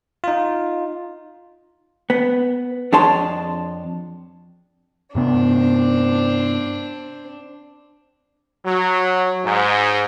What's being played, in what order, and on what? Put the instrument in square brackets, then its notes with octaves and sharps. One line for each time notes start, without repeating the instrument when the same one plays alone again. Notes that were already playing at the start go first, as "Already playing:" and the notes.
[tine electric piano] D#4 F4
[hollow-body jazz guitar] B3
F2 D4 G#4 C#5 A5 C6
[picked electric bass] G2 C3 B3 [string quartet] C4 D4
[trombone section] F#3
G#2